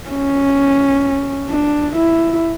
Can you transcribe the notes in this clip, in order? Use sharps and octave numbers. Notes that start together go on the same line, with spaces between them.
C#4
D4
E4